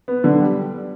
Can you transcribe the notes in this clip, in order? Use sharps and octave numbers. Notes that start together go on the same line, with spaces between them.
B3
D3
G3